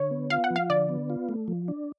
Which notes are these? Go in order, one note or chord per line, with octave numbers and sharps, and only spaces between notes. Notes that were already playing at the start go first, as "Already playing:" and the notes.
Already playing: D3 C#5
B3
F4 F5
F#5
F3
F5
D3 D5
B3
F4
A3
F3
D4